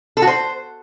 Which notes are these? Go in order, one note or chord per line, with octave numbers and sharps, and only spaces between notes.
A4
F#4
C5